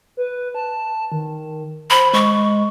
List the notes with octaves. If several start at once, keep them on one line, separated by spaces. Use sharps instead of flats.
B4
A5
D#3
C5 B5
G#3 C#6